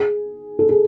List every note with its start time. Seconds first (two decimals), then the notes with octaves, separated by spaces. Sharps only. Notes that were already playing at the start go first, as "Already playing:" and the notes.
Already playing: G#4
0.59 A4
0.69 G#4